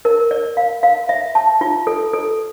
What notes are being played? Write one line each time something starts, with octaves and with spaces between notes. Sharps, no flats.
A#4
D5
F5
F5
E5
A5
F4
A4
A4